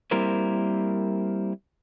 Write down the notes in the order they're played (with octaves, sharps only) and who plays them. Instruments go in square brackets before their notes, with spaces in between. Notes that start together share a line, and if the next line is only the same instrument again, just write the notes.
[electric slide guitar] G3 A#3 C4 E4 A#4 C5